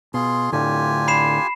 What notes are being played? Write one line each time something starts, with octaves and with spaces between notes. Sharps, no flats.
B2 F4 G#4 C6
A2 D3 F4 G4 G#5
B5 C7 E7